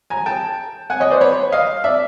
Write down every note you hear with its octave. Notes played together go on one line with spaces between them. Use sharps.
G#5 A#5
G5 A5
F#5 G#5
C#5 D#5
C5 D5
B4 C#5
D#5 F5
D5 E5